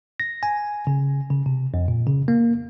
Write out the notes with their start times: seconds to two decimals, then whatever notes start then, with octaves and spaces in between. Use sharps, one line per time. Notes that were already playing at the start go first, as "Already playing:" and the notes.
0.20 A#6
0.43 G#5
0.87 C#3
1.30 C#3
1.46 C3
1.74 F2
1.88 A#2
2.07 C#3
2.28 A#3